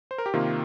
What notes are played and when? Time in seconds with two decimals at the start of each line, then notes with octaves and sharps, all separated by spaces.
0.11 C5
0.18 A#4
0.26 G4
0.34 C3 D#3 A#3 F4